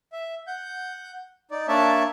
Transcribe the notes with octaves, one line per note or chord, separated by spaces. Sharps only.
E5
F#5 G6
D#4 D5
A#3 D4 C#5 D5 E5 A5